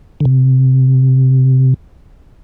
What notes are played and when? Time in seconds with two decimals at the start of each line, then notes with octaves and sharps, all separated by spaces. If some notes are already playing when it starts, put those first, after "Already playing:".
0.20 D3
0.25 C3